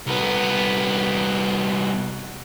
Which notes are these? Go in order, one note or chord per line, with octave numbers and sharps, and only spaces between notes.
C2 B3